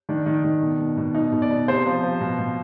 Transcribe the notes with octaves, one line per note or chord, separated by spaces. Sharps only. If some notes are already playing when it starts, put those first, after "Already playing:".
D#3 D4
D#3
D#3
B2
B2
B2
B2 D#4
B2
D5
B2
C3 C5
F3
F3
B2
B2